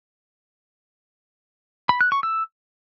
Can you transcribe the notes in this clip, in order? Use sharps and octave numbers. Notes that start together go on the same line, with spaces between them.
B5
F#6
C#6
E6